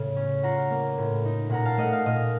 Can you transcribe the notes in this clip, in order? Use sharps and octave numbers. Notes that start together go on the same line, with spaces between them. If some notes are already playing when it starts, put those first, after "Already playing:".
Already playing: A2 C#3
C#4
F4 F#5 A#5
A#3
A2
D#4
A#2 F#5 A#5
F5 A5
A3 D#5 F#5
F5
A#2 D#5